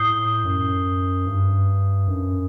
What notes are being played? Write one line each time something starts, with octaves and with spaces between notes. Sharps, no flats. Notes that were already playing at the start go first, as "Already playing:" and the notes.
Already playing: A2 D#6 G6 C7 G7
F#2
G2
F#2